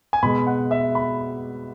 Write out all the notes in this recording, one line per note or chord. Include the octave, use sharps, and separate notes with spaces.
G#5
B2 G#3 B5
F#5
E5
B5